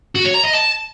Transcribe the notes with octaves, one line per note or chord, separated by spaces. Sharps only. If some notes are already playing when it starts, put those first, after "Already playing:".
F#4
C#5
A#5
D#5
A5